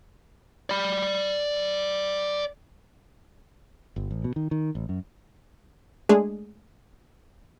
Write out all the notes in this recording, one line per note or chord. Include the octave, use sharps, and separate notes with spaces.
D5 B5
G1
A1
B2
D#3
D#3
A1
F#2
G#3 A3 D4 G#4